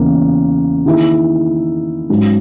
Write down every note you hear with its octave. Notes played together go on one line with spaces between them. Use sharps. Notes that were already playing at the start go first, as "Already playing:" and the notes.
Already playing: E2 C#3 E3 A#3 C#4
D#3 A#3 E4 G#4
G#2 F#3 C#4 F#4